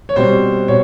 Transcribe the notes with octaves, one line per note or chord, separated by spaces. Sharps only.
C#5
B2 G3 C4 C5
B2 C#5